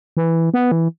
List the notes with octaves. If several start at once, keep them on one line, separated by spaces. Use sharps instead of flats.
E3
B3
E3